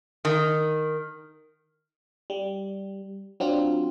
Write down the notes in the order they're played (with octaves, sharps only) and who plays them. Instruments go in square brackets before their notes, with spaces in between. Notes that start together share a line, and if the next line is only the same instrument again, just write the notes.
[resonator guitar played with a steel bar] D#3
[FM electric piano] G3
F#3 C4 D4 F4